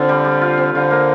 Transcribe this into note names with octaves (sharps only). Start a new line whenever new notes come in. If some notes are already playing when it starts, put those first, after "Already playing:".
Already playing: D3 C4 F4
G3
G3
F4
C4
D3 F4
A#3